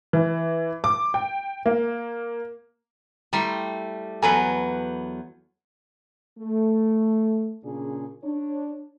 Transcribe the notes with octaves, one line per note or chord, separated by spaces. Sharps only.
E3
D6
G5
A#3
G3 A3 E4 A#5 C6
E2 F#3 A4 B4 G#5 A#5
A3
A#2 C#3 D4 G#4
D4 C#5